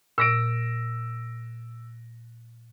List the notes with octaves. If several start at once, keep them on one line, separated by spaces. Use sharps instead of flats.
A#2 E6 A#6 D7